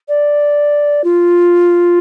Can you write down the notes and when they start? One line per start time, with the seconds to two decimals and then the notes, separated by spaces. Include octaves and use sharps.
0.08 D5
1.04 F4